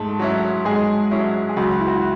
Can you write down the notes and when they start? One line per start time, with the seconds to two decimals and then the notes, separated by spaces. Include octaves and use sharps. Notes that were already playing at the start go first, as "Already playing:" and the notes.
Already playing: G#2 A3 A4
0.19 F#3 C#4 E4
0.65 G#2 G#3 G#4
1.11 F#3 C#4 E4
1.49 G#4
1.57 C#2 F#3 F#4
1.80 E4
1.88 F#4
1.95 E4